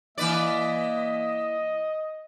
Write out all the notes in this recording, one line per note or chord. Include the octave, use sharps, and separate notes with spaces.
E3 A#3 B4 D5 D#5